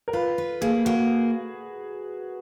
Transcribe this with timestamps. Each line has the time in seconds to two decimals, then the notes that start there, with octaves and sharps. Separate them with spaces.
0.08 A#4
0.13 F4 B4
0.38 B4
0.61 A#3 G#4
0.85 A#3 F#4